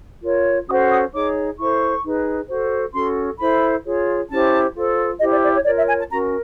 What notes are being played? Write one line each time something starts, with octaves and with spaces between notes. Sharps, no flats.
F4 A#4 C#5
C#4 F#4 A4 C5 D#6
D#6
D#4 G#4 C#5 D6
E4 A4 C5 C#6
D#4 G#4 B4
F#4 A4 C5
C#4 F#4 A4 C6
E4 A4 C5 B5
F4 G#4 C#5
C#4 E4 G4 C5 A5
F4 A4 C5
E4 G4 C5 D#5
D5
D5
C#5
F4 A#4 C#5 D5
E5
G#5
A5
C#4 F#4 A#4 A#5